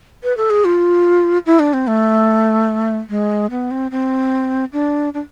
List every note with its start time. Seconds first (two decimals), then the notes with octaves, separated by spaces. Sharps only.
0.23 B4
0.37 A4
0.50 G#4
0.65 F4
1.46 E4
1.59 D4
1.73 C4
1.87 A3
3.10 G#3
3.51 B3
3.71 C4
3.91 C4
4.73 D4
5.14 D4